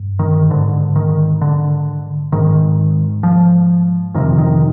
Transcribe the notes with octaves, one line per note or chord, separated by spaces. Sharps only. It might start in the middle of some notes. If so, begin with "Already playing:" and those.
Already playing: G2
D#3
G#2 D3
D#3
D3
G#2 D#3
F3
F2 C3 D#3
D#3